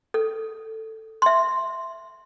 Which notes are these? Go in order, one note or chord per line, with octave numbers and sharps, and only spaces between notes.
A4
E5 C6